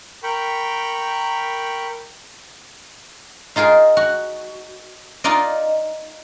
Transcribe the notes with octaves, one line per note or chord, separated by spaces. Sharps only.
A#4 G5 B5 C#6
D#4 F4 G#4 A#4
F#4
D#4 F4 A#4 D5 D#5